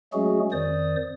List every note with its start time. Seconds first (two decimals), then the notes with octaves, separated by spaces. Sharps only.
0.13 F#3 G#3 A3 C#4 F#4 G#4
0.52 F2 D#3 C5 D5 D#6